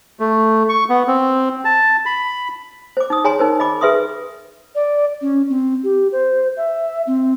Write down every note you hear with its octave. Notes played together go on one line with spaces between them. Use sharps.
A3
C#6
B3
C4
A5
B5
C5 D6
D#4 D#6
G#4 C#5 G#5 A#5 C6
D#4 A#4 C5
D#5 B5 D6
G#4 B4 E5 C6 D#6
D5
C#4
C4
G4
C5
E5
C4